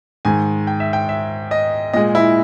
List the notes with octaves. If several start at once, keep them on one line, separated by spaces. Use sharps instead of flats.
G#2 D#3 G#3 G#5
G5
E5
G5
E5
D#5
A#2 G#3 D#5
E4